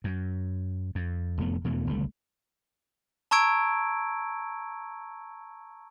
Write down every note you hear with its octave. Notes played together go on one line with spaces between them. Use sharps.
F#2
F2
F1 F2 A3 B3
E2 B2 E3 A3
G1 C#2 G3 A3
A5 A#5 C#6 E6 G#6 D7